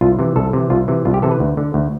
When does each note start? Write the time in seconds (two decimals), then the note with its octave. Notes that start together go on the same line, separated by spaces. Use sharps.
0.01 C2 F4
0.19 C3 E3
0.36 C2 A4
0.53 C3 E3
0.70 C2 F4
0.88 C3 E3
1.05 C2 F4
1.14 G4
1.22 C3 E3 A4
1.31 B4
1.40 D2
1.57 D3
1.74 D2